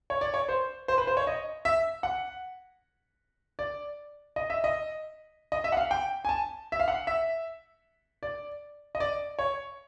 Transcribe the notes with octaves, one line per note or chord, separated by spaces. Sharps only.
C#5
D5
C#5
C5
C5
B4
C5
C#5
D#5
E5
F#5
D5
D#5
E5
D#5
D#5
E5
F#5
F5
G5
G#5
A5
E5
F5
F#5
E5
D5
D#5
D5
C#5